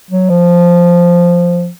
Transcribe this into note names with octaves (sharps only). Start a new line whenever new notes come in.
F#3
F3